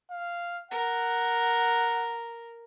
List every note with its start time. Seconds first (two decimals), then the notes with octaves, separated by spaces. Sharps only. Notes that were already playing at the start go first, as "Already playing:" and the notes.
0.11 F5
0.71 A#4 F#5